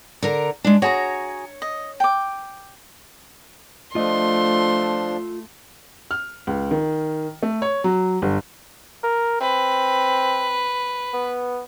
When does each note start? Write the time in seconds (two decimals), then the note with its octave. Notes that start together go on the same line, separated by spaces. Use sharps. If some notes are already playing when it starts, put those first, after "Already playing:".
0.22 D3 A#4 A#5
0.64 G#3 D4
0.82 F#4 G#4 C#5 A#5
1.62 D#5
2.00 G5 D6
3.95 F3 A3 D4 F4 D#5 C6
6.11 F6
6.47 C#2
6.71 D#3
7.43 A3
7.62 C#5
7.84 F#3
8.22 G1
9.04 A#4
9.41 C4 B4
11.14 B3